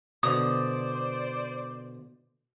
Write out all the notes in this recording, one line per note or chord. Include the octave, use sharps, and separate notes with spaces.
B2 D3 C5 D5 D#6